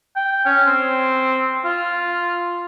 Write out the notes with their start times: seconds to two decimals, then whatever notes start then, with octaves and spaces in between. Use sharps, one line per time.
0.16 G5
0.46 C#4
0.67 C4
1.65 F4